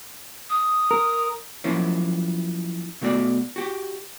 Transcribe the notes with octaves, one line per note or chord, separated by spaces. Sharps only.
D#6
A#4
F3 F#3 A#3 C#4 E4
B2 A3 F#4 D5
F#4 G4